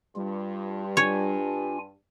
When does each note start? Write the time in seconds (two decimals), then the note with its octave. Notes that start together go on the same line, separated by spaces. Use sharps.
0.16 G2 G3 F4
0.97 D4 F4 C#5 G#5